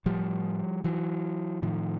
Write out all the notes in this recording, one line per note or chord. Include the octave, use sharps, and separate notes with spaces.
A2 F3 G3
E3 F#3
A2 D#3 F3